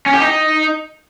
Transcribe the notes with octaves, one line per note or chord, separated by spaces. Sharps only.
C#4
G4
D#4